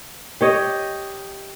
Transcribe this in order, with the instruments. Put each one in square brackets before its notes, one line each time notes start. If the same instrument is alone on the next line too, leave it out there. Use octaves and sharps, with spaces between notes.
[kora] G4 C#5 D#5